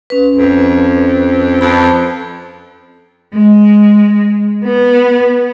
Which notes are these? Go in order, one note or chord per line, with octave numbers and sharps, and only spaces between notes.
C#4 B4
F2
F2 A5 B5
G#3
B3